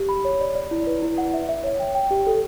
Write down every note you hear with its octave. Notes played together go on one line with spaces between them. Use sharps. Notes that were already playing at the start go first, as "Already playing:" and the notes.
Already playing: G4
B5
C#5
D5
D5
E4
B4
E4
F#5
E5
E5
C#5
G5
G5
G4
A4